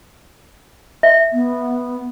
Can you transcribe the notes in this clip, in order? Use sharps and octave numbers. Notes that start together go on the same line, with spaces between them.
E5
B3